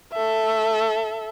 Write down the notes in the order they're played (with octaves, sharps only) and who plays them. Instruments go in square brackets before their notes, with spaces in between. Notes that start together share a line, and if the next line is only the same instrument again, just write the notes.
[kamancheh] A4 E5